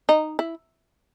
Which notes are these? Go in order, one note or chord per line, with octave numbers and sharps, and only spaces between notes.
D#4
E4